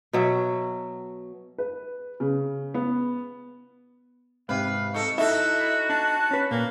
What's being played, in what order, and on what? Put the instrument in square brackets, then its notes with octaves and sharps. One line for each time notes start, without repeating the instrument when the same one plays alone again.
[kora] B2 F#3 E5
[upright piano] B4
C#3
B3
[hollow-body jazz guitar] G#2 C3 [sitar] B4 [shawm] F5
[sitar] D#4 A4 [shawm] C#6
[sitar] D#4 A4 [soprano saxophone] E4 [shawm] F#4 [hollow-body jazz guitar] E5
[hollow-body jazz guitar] D4 [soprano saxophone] A5
[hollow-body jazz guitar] C#4 B4
[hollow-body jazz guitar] A#2 [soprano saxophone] A#3